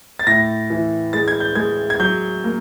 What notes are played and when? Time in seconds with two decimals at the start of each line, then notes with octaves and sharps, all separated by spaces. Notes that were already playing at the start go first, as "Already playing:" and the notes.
0.19 A6
0.27 A2 A#6
0.70 E3
1.13 G#3 A6
1.28 G#6
1.40 G6
1.55 G#3 G#6
1.90 G#6
1.99 F#3 G6
2.44 A#3